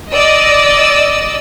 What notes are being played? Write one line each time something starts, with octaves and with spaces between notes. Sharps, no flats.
D5 D#5 E6